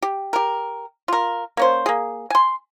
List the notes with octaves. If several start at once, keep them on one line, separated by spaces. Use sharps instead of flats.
G4
G4 A#4
F4 A#4
A#3 C#4 C5
A#3 G#4
G#5 C6